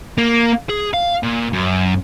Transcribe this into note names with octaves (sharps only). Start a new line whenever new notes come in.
A#3
G#4
F5
A#2
F#2